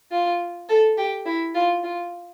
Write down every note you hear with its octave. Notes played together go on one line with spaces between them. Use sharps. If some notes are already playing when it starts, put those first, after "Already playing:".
F4
A4
G4
E4
F4
F4